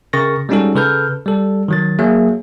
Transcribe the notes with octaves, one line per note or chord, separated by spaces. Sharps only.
C#3 A#4 C#6 A6 A#6
G3 G#3 C#4 D#4 F#4 A4
C#3 A4 B4 F6 G6
G3 A4
D#3 F#3 A6
F#3 A#3 G#4 E5